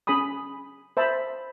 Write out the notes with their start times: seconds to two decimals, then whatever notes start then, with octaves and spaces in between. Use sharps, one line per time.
0.07 C#4 G#4 G#5 B5 D#6
0.97 C5 E5 A5 B5